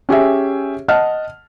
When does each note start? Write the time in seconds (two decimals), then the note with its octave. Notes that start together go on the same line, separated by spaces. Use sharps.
0.09 C#4 G4 G#4 E5
0.88 D#5 F#5 A5 F6